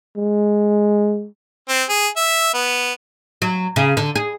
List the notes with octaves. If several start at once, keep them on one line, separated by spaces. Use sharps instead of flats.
G#3
C4
G#4
E5
B3
F#3
C#3
D3
G#4